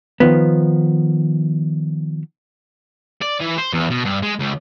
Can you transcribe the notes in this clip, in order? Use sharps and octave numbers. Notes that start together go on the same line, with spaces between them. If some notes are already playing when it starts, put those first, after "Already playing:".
D#3 F3 B3
D5
E3
C5
E2
B2
G2
G#3
C#2